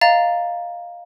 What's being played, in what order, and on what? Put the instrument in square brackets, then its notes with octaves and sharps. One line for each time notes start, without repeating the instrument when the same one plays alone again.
[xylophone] D#5 F5 A#5 A6